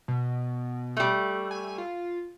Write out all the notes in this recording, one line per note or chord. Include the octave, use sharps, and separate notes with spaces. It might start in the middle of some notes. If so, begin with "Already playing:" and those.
B2
G3 A3
G#5
F4